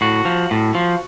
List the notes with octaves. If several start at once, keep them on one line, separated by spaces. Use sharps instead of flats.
A2 F#4
F3
A2
F3